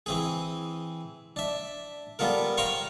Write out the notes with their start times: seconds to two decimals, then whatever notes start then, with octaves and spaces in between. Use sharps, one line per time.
0.06 E3 C4 G#4
1.36 D4 E5
2.19 G3 B3 F4 A4 A#4
2.57 C5 F5 G5 A#5 C6 C#6